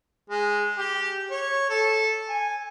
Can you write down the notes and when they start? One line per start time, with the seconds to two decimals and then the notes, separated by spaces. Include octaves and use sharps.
0.30 G#3
0.78 G4
1.31 C#5
1.69 A4
2.29 G#5